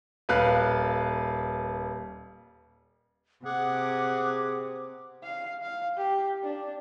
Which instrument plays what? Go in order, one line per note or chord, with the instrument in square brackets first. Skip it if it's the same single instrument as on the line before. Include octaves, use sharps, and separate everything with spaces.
[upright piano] D#1 B4 F5 F#6
[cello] C3 [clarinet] G#4 [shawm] F#5 [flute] D6
[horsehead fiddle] F5
F5
G4
D4